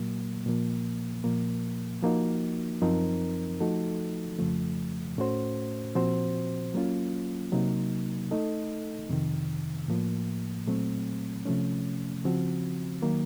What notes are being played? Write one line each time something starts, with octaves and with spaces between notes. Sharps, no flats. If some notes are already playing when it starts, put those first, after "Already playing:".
Already playing: A#2 F#3 A#3
A#2 F3 A#3
A#2 F3 A#3
F3 A#3 D#4 F#4
F#2 F3 C4 D#4 A#4
F3 A3 D#4 F#4 A4
F2 C#3 F3 A3
A2 A3 C#4 F#4 C5
A#2 F3 C4 F#4 C5
F#3 A#3 C#4 F4
C3 F#3 A#3 D#4
A3 D#4 A4 D#5
F2 C3 D#3
A2 F3 A#3
A#2 F#3 A3 C4
C3 F3 A3 C#4
C#3 F3 C4 F#4
D#3 F#3 A#3